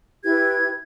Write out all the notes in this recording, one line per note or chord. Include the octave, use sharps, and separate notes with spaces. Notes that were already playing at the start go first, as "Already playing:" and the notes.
E4 G4 B4 G#6